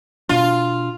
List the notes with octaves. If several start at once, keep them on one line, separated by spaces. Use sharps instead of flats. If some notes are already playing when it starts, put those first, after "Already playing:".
B2 D4 F4